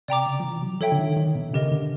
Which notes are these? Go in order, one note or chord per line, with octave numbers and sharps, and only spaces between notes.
C3 D5 G5 A#5 D6
C#3
F3
E3
F#3
F3 A4 C#5 E5 G5
D3
D#3
D#3
B2
C#3 G4 A#4 D#5
D3